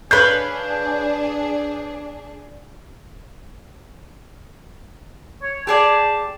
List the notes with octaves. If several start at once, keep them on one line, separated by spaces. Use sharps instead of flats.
D4 G#4 B4 C#5 F5 G6
C#5
G4 G#4 D5 A5